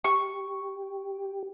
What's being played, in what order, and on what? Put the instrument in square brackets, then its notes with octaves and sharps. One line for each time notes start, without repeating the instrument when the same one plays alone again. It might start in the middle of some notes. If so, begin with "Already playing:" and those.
[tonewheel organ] G4 [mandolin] C#6